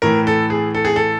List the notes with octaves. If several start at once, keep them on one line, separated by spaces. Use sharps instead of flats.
A2 E3 A#4
A4
G#4
A4
G#4
A4